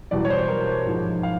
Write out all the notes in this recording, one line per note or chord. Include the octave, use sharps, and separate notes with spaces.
E2 B2 G3 D5
C#5
C5
A#4
C5
G#2 F3 G#3
F5